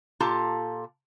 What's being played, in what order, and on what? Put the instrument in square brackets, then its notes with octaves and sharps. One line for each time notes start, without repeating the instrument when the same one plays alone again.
[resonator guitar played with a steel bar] A#2 F4 G4 A4 A5 A#5